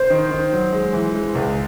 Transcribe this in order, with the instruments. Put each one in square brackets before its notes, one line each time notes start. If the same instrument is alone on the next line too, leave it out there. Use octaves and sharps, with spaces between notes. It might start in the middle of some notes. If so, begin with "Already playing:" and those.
Already playing: [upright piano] C5
[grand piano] D#3
D#3
F#3
G#3
E3
G#3
C#2